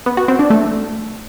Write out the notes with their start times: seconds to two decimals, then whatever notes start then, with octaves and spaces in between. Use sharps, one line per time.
0.06 B3
0.17 F#4
0.28 C4
0.39 D4
0.50 A3